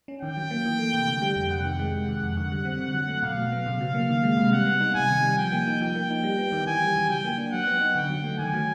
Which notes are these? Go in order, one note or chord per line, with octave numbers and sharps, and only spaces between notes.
C#4
D#3 G5
F#3
A#3
E3
A3
C3
D3
G3
F2
C3 F#5
D#3
G#3
C3
D#3
F2
D3
G3
C4
D3
F#3
A3
B2 F5
F#3
B3
C#3
F#3
A#3
D#3
G#3
C3
G3 F#5
B3
D#4
C3 G#5
D#3
G3
F3 G5
A#3
D#4
F3 G5
A#3
D#4
G3
B3
D#3
E3 G#5
G3
C#3
F#3 G5
A#3
D4
F#3 F#5
B3
D#4
D3 G5
F#3
A3
D#3 G#5
F#3